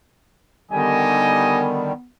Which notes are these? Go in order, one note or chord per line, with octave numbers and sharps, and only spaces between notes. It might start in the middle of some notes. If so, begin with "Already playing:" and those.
D3 D#3 G3 B3 D#4 G4 D#5 G#5